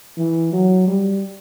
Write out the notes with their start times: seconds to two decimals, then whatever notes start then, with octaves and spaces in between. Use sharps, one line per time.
0.17 E3
0.53 F#3
0.88 G3